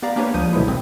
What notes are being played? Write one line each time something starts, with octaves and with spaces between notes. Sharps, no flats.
B3 G4 D5 F5 A#5
A#3 D4 G4 B4 C#5
C#2 F3 D#6 G6 D#7
B2 D3 E3 F#3 G#3 E4
A1 C4 D#6